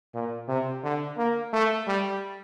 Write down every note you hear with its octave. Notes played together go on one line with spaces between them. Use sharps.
A#2
C3
D3
A#3
A3
G3